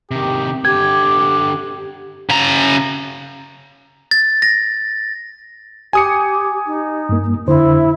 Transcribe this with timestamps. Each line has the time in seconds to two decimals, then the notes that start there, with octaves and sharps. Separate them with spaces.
0.11 C3 D#3 G4
0.65 D3 G4 G5 D6 G#6
2.30 C#3 A#5
4.11 A6
4.42 A#6
5.93 G4 G#5 D#6 C#7
6.66 D#4
7.09 G2 A#3
7.47 F2 D3 E4 C5